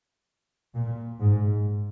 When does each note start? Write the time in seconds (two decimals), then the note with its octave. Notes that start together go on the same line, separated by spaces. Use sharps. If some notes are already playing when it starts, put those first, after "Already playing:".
0.75 A#2
1.20 G#2